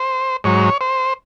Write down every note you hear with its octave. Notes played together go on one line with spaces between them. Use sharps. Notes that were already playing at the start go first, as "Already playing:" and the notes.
Already playing: C5
G#2 F#3 C#5
C5